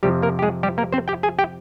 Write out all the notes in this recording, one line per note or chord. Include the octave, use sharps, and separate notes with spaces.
F2 C3 F3 G3 G4
A#3 A#4
G4
G#3 G#4
G3 G4
A#3 A#4
C4 C5
G4 G5
G#4 G#5
G4 G5